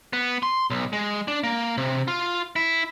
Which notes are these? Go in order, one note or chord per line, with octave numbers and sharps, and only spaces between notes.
B3
C6
B1
G#3
D4
A#3
C3
F4
E4